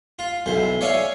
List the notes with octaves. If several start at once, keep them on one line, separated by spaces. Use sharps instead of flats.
F4
B1 E3 C5
C#5 D5 E5 F5 G#5 C#6